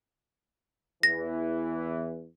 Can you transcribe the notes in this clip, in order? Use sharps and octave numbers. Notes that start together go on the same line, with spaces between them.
E2 E3 A#6